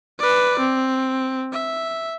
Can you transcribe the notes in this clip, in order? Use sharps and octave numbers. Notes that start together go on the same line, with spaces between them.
B4 D5
C4
E5